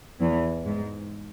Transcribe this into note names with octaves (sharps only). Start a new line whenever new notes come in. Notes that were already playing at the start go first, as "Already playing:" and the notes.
E2 E3
G#2 G#3